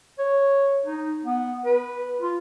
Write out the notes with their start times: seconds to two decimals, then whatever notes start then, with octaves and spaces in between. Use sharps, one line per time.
0.19 C#5
0.85 D#4
1.24 B3
1.65 B4
2.21 F4